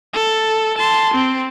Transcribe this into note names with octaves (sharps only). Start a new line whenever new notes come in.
A4
A5 C6
C4